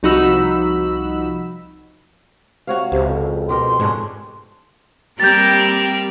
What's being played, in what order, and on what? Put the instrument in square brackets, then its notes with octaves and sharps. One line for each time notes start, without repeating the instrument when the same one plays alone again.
[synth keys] C2 F3 D#4 F#4 B5 E6
[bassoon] C3 [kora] F#4 C#5 F5
[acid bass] C#2 [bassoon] C3
[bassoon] F2
[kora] B2 G4 A#4 [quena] C6
[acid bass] G#2 [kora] C#4 D4 G#4
[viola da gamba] G3 A#3 A#4 [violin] C4 G4 [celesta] G6 A6